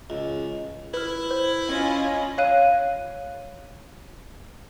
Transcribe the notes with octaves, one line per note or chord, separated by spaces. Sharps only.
C#2
E4 B4 F6
C5
C#4 F4 D#5
C#5 F5 F#6 D#7